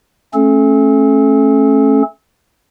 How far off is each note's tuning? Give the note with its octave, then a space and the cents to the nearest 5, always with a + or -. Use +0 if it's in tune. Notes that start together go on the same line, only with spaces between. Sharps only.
A3 +0 C#4 -25 A4 -35